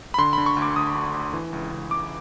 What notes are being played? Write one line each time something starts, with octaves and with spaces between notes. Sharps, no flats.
B5
D3 C6
D3 B5
C#6
D2
D6
D2 D#6
D2
D2
E3
C#2
C#2
C#2 D6